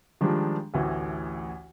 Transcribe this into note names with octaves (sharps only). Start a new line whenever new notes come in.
D#3 F3 G3 G#3 D4
A1 D2 E3